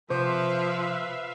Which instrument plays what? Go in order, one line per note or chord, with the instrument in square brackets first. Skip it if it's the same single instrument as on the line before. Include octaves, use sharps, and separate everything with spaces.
[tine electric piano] C3 [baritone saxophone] F3 [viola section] B4 E5 F5 [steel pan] C5